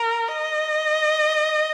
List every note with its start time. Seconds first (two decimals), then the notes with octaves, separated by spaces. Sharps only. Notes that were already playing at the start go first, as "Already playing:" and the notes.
Already playing: A#4
0.28 D#5